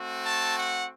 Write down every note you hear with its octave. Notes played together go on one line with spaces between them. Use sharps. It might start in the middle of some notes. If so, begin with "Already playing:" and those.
Already playing: A3 C4 F#4
A5
F#5